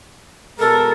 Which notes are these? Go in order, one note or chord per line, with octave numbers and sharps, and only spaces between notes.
B2 G#3 A4 A#4